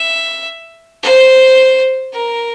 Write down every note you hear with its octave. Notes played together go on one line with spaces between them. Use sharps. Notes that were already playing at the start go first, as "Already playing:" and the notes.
Already playing: E5
C5
A#4